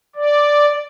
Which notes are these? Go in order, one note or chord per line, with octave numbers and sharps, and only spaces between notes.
D5